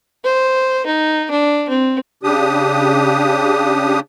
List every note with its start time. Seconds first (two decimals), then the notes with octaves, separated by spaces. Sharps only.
0.24 C5
0.86 D#4
1.31 D4
1.69 C4
2.23 C#3 D4 G4 D#6